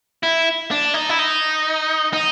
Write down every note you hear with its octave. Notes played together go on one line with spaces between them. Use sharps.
E4
D4
D#4
E4
D#4
D#4